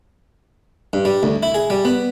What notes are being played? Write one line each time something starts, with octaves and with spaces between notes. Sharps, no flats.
G2
G3
D2
E4
G#4
G3
B3